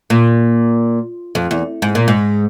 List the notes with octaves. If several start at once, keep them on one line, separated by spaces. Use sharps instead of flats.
A#2
F2
E2
G#2
A#2
G#2